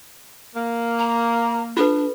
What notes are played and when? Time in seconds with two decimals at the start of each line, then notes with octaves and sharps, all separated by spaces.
0.55 A#3
0.99 A#5
1.77 D4 F4 A4 B4